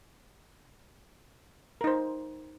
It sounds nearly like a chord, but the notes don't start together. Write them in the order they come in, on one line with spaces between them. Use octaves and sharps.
A#4 D#4 C5